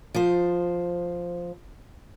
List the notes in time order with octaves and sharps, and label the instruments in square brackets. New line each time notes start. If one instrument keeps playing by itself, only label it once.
[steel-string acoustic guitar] F3 C5